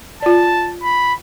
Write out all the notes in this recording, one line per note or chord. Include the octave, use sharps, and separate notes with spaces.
F4 D5 A5
B5